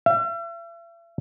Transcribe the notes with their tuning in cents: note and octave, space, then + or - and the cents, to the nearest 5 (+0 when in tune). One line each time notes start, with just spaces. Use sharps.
E5 +40